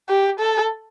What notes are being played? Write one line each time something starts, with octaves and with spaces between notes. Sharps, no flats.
G4
A4